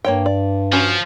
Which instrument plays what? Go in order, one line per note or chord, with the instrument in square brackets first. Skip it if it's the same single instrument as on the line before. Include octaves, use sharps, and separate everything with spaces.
[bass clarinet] G2 [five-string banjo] A#3 C#5 G5
[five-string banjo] D5
[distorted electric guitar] F3 [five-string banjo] C#4 F#4 B4